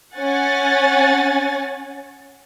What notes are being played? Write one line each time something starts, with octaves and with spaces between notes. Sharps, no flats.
C#4 F#5 G#5 A6